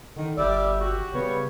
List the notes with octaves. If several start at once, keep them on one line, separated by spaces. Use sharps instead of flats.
D3 D#3
G1 G3 D5 E5
F#4 G4
C#3 G3 B3 C#5